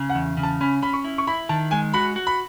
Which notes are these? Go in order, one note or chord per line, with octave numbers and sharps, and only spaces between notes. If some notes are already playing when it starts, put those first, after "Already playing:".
Already playing: C#3
F#5
E2
C#3
A5
C#4 B5
C#4 B5
C#6
E4
C#6
E4 B5
D#3 A5
G#3 G#5
F#4 B5
F#4
B5